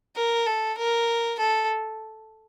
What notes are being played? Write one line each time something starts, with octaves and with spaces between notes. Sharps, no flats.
A#4
A4
A#4
A4